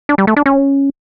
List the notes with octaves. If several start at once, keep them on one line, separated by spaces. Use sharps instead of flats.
D4
G3
A3
D4
C#4